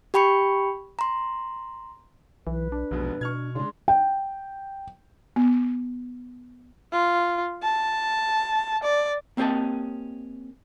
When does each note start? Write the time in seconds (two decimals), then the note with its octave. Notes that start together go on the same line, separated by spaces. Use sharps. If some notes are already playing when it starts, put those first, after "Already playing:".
0.14 G4 G5 B5 C#6 C#7
0.99 A#5 C6
2.47 B1 E3 B4
2.72 D4
2.91 F1 B1 G#2 B2
3.21 B2 C#6 F6 G#6
3.55 C#3 G#3 D4 C6
3.88 G5
5.36 B3
6.92 F4
7.63 A5
8.83 D5
9.37 A#3 C4 C#4 G4 D#5 A5